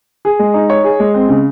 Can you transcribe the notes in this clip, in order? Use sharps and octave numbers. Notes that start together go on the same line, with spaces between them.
G#4
G#3
D#4
C#5
G#4
G#3
C4
C#3